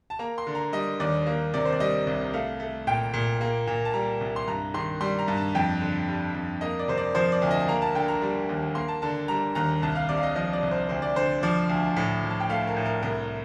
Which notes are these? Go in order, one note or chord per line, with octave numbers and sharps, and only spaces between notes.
A5
A#3 A#5
C6
D3
A#5
G3 D#5
D#2 D5
A#3
C3 D5
C5
D5
G3 D#5
C2
A3 F5
A3
A#2 G5
A#2
A#3
A#2
A5
G3 A#5
C2
C6
G2 A#5
D#3 C6
G3 C6
A#5
G2
A5
F2 G5
D3
G3
F2
A#3 D#5
D5
C3 C5
D5
F3 C5
D5
D2
D#5
A#3 A#5
A5
D3 G5
A#5
G3
D#2
A#3 C6
A5
D3 A5
G3 A#5
D#2 A#5
C2 A5
F5
C3 D5
F5
D#5
F3 D#5
D5
C2
C5
D2 C5
D5
D3 C5
F3 D5
D2
A2
F3
A5
G5
A3 F5
A#4
A2
A#4
C2 A#4